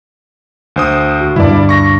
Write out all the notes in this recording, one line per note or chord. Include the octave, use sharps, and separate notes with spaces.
D2 C5 D#6
F#4
D2 G2 E4 D5
C#6 A#6